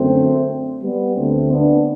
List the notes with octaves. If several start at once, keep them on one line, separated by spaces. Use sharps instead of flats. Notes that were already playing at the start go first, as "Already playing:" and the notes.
Already playing: F#2 D3 A3 C4
G3 B3
D2 D3 A3 C4
B3 D4